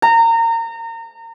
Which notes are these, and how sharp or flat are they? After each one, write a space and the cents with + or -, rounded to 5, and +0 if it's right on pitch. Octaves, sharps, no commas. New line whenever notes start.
A#5 -30